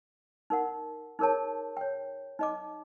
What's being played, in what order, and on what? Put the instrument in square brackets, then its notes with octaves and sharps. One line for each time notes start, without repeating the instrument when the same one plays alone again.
[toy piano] D#4 A#4 F#5
D#4 G#4 A#4 C#5 A5
C#5 G5
D#4 D#5 D6